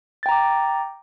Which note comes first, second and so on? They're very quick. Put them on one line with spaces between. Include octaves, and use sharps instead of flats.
A6 G5 A#5 D6